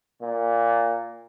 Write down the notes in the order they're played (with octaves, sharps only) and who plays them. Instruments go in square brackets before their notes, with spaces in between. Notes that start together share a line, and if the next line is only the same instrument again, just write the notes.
[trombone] A#2